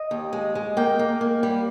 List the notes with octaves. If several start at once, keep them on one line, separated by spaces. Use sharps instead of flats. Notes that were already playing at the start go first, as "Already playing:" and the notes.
Already playing: D#5
D#2
G#3
G#3
A#3 G5
A#3
A#3
G3